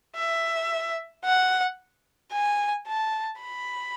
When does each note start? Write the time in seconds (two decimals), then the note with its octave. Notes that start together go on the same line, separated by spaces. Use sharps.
0.16 E5
1.24 F#5
2.32 G#5
2.87 A5
3.42 B5